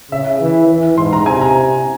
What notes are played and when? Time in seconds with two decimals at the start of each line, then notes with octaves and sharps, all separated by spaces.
0.11 C#3 E5
0.40 E3
0.69 E3
0.98 G#2 C6
1.13 A#5
1.26 C3 G#5
1.41 A#5